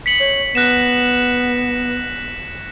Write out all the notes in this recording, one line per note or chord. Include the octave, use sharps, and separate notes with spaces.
B6 C#7 F#7
C#5
B3 F#6 A#6 E7